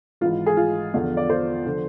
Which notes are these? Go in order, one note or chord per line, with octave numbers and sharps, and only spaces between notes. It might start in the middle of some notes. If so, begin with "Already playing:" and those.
G#1 G#2 E3 F4
G#4
F4
E2 D3 F3
D5
C5
D3 F3